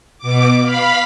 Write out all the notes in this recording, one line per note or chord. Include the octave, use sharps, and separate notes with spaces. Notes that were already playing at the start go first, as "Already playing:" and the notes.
B2 D6
F5 B5